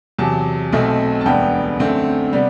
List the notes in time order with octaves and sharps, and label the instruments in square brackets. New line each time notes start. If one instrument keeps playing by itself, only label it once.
[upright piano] E2 C3 F#3 A5
B1 B2 A3 C4
A5
E1 D2 D3 G3 B3 G5
F#2 D3 A3 C4
C3 G3 B3 D4